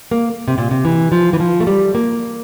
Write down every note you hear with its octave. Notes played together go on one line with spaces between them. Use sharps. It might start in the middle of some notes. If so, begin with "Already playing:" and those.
A#3
C3
A#2
C3
E3
F3
E3
F3
A3
G3
A#3